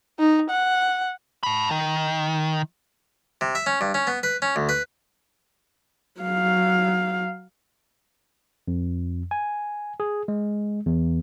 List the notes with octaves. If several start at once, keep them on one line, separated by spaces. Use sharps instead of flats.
D#4
F#5
A5 B5
D#3
C3
E5
C#4
G2
C#4
B3
B4
C#4
D2
B4
F#3 F5
F2
G#5
G#4
G#3
E2